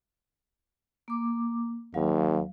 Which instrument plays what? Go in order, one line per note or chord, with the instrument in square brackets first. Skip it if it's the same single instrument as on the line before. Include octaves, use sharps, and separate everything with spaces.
[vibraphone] A#3 D6
[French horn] D#2 [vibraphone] F#3 F5